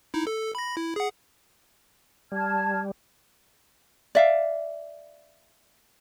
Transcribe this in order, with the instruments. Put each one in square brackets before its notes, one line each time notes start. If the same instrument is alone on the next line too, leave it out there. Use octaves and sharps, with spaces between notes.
[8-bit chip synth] D#4 E4
A4
B5 A#6
E4
G#4 F#5
[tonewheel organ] G3 [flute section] A5 F6 G#6
[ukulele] D5 E5 F5